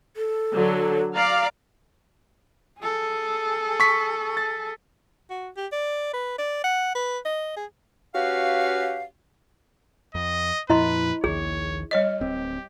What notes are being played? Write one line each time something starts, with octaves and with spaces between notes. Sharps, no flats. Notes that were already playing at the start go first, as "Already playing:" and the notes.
A4
D3 F#3
D5 F5 A#5
G#4 A4
C#6 B6
A6
F#4
G4
D5
B4
D5
F#5
B4
D#5
G#4
C#4 F#4 G4 B4 F5
F2 D#5
F2 A#2 F3 E4 B4 D#5 C6
A#1 D#2 D#3 G#4 C#5
G3 C#5 D#5
D1 C4 G4